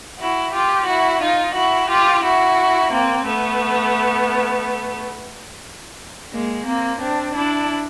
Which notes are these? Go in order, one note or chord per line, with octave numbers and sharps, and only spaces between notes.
E4 F#4
F4 G4
E4 F#4
D#4 F4
E4 F#4
F4 G4
E4 F#4
A#3 C4
A3 B3
G#3 A#3
A#3 C4
C4 D4
D4 E4